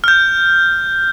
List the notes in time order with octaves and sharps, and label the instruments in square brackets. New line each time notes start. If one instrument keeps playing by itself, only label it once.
[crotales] F6 G6